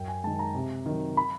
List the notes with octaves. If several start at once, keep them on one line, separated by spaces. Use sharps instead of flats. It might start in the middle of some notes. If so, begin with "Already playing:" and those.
Already playing: F#2 G5
G#5
D#3 G#3 A5
A#5
C3
D#3 F#3
B5